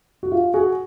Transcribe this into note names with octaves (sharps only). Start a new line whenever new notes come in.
F#4
F4 G4
F#4 G#4